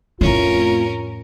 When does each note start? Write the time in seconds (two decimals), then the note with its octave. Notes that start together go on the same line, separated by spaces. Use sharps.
0.21 F2 A2 A3 C4 C#4 F4 A#4